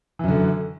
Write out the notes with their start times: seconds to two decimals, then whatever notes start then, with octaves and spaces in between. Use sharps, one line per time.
0.19 E3
0.24 F#2
0.28 D3